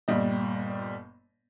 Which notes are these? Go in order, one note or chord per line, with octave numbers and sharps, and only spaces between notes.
G1 A#2 G3 D#5